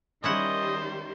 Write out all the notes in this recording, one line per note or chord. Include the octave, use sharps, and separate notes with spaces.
D#3 G3 C#4 E4 C5 D#5 F#5